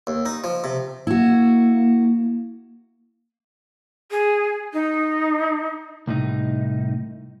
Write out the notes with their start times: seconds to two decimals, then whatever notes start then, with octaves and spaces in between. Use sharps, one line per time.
0.07 D#2
0.26 D#4
0.44 F3
0.64 C3
1.07 A#3 E4 F#4
4.11 G#4
4.73 D#4
6.07 C2 A2 D#4